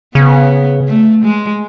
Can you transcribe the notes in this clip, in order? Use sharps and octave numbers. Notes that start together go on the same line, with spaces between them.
C#3 B3
A3
G#3